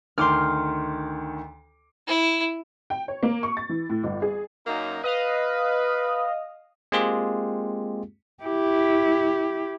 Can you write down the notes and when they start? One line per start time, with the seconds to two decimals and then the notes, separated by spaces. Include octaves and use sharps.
0.18 D2 D#3 C6 D6 F6
2.07 E4
2.90 G5
3.08 C#5
3.23 A#3
3.43 C#6
3.57 A6
3.69 E3
3.90 A2
4.03 G1
4.22 G#4
4.66 F#2 A#3 D#4
5.04 B4 D#5 F5
6.92 G#3 A#3 C4 F4 G4 G#4
8.44 E4 G4